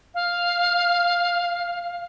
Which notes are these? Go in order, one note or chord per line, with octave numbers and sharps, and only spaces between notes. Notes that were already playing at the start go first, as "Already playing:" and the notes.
F5